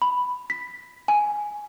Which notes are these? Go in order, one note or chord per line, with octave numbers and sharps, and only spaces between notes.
B5
B6
G#5